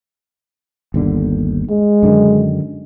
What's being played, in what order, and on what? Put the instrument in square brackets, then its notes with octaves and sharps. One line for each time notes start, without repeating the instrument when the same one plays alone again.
[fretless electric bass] G1 D#2 D3
[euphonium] G#3
[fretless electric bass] F#2 D3 D#3